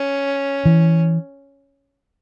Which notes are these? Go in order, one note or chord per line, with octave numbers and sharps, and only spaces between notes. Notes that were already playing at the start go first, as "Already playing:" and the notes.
Already playing: C#4
E3